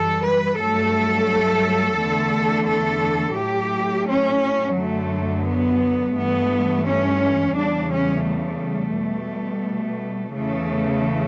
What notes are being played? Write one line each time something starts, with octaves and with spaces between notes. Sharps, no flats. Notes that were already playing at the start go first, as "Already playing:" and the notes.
Already playing: F#2 E3 G3 A4
B4
G2 F#3 A3 A4
E2 D3 A3
A4
A2 F#3 A3 G4
C#4
F#2 D3 F#3 A3
B3
G2 E3 A3 B3
C#4
E2 C#3 G3 D4
C#4
A3
B2 G3
E2 C#3 E3 A3